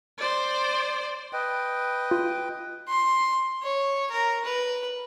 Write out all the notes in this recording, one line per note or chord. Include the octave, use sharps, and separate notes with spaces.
C5 D5
B4 D#5 G5
F4
C6
C#5
A#4
B4